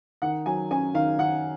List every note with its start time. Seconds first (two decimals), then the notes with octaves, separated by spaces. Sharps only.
0.22 D#3 F#5
0.46 F#3 G#5
0.71 C#4 G#5
0.94 D#3 F5
1.18 D#3 F#5